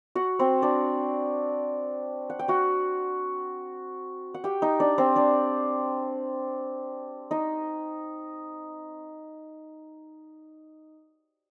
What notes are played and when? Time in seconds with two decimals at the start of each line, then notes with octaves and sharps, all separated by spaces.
0.15 F#4 F#5
0.39 C4 C5
0.62 D4 D5
2.30 F#5
2.39 G5
2.48 F#4 F#5
4.34 F#5
4.44 G4 G5
4.62 D#4 D#5
4.80 D4 D5
4.98 C4 C5
5.16 D4 D5
7.31 D#4 D#5